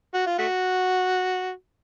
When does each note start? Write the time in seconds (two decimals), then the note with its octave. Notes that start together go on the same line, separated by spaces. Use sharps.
0.14 F#4
0.26 F4
0.38 A3 F#4